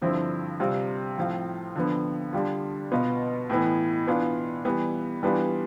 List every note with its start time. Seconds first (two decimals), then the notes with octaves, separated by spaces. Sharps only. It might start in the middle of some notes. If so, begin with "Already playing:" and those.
0.02 G2 D3 F3 C4 E4
0.60 C3 G3 C4 F4
1.18 A2 F3 C4 F4
1.76 D3 F3 B3
2.33 D3 G3 D4 F4
2.92 B2 B3 F4
3.50 A2 E3 B3
4.07 E3 B3 D4 F4
4.65 E3 G3 B3
5.23 E3 G3 B3 D4 F4